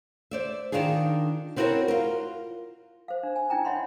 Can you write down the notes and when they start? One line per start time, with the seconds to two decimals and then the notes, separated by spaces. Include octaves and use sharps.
0.31 C5 D5 E5
0.72 D#3 D4 D#4 F4 G#4
1.56 B3 C4 E4 F#4 A#4 C#5
1.88 F4 A#4
3.08 C5 F5
3.23 D4
3.36 G#5
3.50 C#4 D4 E4 G5 A#5
3.65 C#5 D#5 E5 F#5 B5 C6